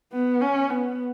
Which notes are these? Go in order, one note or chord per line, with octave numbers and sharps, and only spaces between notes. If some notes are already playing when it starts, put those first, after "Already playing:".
B3
C#4
B3